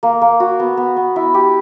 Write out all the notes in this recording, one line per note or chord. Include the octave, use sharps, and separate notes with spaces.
A#3
A#3
F#4
B3
B3
B3
E4
G4